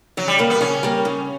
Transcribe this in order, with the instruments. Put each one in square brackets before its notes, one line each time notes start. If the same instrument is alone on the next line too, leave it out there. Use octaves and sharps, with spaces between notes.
[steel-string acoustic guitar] C#3 [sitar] F#3
[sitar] G3
[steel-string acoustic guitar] G3 A#3
[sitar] B3
[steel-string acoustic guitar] C#3 [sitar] C#4
[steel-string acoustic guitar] G3 A#3
C#3